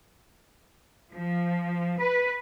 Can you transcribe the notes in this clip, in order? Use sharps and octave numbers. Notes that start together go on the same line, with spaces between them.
F3
B4